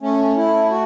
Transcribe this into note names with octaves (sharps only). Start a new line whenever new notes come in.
A3 C#4
A3 E4
F#4